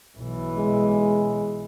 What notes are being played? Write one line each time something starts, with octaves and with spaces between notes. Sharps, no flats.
B1 E3
G#3